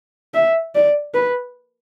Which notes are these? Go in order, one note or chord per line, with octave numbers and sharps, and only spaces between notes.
E5
D5
B4